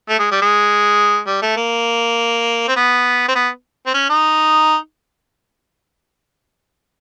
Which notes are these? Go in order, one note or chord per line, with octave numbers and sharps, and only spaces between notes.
A3
G#3
G3
G#3
G3
A3
A#3
C4
B3
C4
B3
C4
C#4
D#4